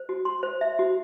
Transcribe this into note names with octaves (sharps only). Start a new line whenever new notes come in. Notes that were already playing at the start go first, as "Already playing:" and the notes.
Already playing: C5
F#4
C6
C5
E5
F#4